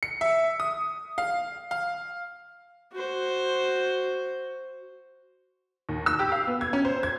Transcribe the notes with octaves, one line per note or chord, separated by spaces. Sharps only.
C#7
E5
D#6
F5
F5
F#4 C5
D#2
E6
G4
F5
B3
G#6
C#4
C5
G#6